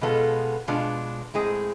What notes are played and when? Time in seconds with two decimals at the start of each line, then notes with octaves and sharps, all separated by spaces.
0.01 B2 G#3 B3 F4 A4
0.68 B2 G#3 B3 D4 F4
1.34 A2 G#3 C4 G#4